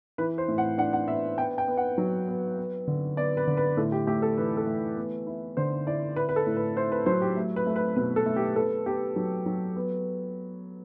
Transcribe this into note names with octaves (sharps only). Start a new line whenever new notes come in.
E3 B4
C5
A2
F#5
D4 F#5
F#5
B3 E5
B3 G5
G5
B3
F#5
F#3
B3
B3
D3
B3 D5
B4
D3
B4
A2 A4
G4
A3 G4
A4
E3 B4
A4
A3
B3
E4
D3 C5
E4 D5
E4 B4
B4
A4
A2
B4
E4 C5
B4
F#3 C5
G4
A3
B4
A3
B4
B2 B4
A4
A3
G4
B3 A4
B3 G4
F#3
F#3
B3